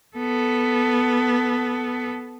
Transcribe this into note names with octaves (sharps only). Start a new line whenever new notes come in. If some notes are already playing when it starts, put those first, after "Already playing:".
B3 A4